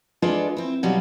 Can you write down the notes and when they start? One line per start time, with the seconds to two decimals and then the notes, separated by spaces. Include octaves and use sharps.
0.22 G#3 D4 F4 A4 B4 D5
0.57 C4 E4
0.83 B2 F#3 G3 F4